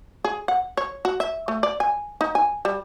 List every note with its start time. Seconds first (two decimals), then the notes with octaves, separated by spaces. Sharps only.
0.25 G#4
0.48 F#5
0.77 C#5
1.05 F#4
1.20 E5
1.48 A3
1.63 D5
1.80 G#5
2.21 D#4
2.35 G#5
2.65 G3